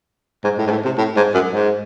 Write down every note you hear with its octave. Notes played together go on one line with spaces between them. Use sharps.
G#2
A2
G#2
A2
C3
A2
G#2
F#2
G#2